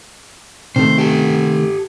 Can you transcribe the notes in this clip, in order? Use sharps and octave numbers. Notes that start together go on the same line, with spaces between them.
C3 D#3 A3 C5
G4 A4